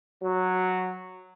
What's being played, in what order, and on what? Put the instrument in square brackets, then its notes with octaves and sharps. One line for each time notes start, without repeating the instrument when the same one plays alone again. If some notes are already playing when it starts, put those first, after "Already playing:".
[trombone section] F#3